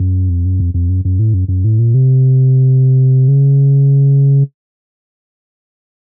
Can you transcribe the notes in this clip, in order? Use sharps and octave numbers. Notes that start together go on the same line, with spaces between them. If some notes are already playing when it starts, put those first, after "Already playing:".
Already playing: F#2
F2
F#2
F2
F2
F#2
F#2
A2
F#2
F#2
A2
A#2
C3
C#3